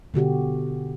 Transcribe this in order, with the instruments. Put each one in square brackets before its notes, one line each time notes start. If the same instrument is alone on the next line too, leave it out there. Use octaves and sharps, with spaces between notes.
[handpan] B2 D3 F#4 G4